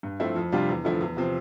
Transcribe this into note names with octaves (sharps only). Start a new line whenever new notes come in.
G2
F3 A3 C4 E4
F2
C3 G3 D4 F4
E2
D3 F3 A3 E4
E2
C3 F3 C4